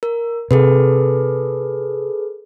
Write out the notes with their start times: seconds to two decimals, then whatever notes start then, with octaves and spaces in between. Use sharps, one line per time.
0.03 A#4
0.51 C3 G#4 A4 B4